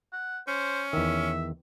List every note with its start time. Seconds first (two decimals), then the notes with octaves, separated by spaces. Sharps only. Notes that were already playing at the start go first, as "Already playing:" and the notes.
0.13 F#5
0.48 C#4 C5
0.93 E2 D#3 E5